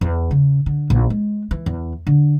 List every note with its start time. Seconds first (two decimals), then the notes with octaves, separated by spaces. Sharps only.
0.01 E2
0.31 C#3
0.66 D3
0.90 A#1
1.10 G#3
1.51 E3
1.66 E2
2.07 D3